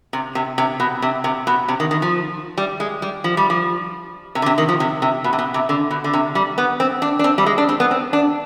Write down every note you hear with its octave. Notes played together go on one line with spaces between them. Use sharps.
C3
C3
C3
B2
C3
C3
B2
C3
D#3
D#3
F3
G3
G#3
G3
F3
G3
F3
C3
D3
C3
D#3
F3
C3
C3
B2
C3
B2
C3
D3
B2
D3
C3
G3
B3
C4
D4
D4
C4
G3
G#3
D4
C4
B3
C4
D4